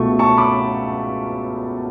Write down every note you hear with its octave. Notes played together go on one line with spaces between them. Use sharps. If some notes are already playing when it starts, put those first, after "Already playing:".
Already playing: C#2 B2 A3 C#6
A5 C#6
B5 D6